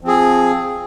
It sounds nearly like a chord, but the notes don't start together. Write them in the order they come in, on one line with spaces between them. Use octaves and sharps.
F3 C4 G#4